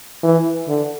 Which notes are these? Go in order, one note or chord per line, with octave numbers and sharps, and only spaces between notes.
E3
D3